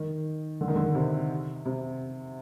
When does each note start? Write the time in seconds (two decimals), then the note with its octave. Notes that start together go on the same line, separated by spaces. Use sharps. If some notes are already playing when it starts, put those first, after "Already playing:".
Already playing: D#3
0.61 D3
0.68 D#3
0.76 D3
0.95 C3
1.65 C3